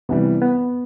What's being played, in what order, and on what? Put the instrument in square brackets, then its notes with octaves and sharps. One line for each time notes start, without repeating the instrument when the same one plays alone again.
[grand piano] C3 E3 G3 [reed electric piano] B3
[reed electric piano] B3